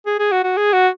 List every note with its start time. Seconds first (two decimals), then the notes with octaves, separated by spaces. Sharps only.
0.06 G#4
0.19 G#4
0.32 F#4
0.44 F#4
0.57 G#4
0.73 F#4